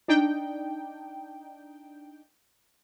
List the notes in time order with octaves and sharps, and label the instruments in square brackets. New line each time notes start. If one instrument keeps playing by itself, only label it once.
[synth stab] D4 D#4 G5